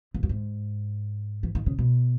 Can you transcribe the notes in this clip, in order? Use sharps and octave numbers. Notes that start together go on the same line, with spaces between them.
E2
F#2
G#2
E3
D#3
C#3
B2